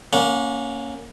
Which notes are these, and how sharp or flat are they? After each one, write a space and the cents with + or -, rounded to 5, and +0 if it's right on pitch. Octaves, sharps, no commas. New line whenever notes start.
A#3 +0 C#4 +0 F#5 -30